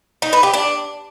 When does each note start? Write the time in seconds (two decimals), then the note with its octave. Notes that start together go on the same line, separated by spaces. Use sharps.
0.22 D#4
0.33 B4
0.43 G4
0.54 D4